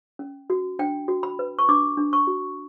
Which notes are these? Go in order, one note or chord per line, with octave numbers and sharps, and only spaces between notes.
C#4
F#4
D4 G5
F#4
B5
B4
C#6
D4 D6
D4
C#6
F#4